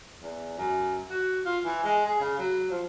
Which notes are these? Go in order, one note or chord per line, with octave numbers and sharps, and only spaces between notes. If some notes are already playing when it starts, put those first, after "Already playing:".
E2
F#2
F#4
F4
E3
G#3
G#4
C#3
F#3
F3